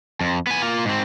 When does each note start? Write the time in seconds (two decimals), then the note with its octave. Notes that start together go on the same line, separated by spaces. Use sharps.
0.21 F2
0.47 B3 G#5
0.62 A#3 F4
0.85 G#2 C4